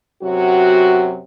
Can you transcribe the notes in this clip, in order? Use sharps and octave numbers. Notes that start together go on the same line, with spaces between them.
F#2 C3 F#3 F#4